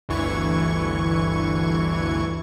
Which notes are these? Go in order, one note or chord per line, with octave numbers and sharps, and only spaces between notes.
G1 D2 E3 C#6 G#6